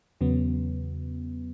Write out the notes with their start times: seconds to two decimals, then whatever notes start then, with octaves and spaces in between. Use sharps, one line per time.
0.21 E2 C#3 F#3 B3